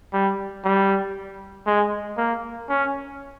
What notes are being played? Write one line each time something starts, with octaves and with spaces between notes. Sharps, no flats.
G3
G3
G#3
A#3
C#4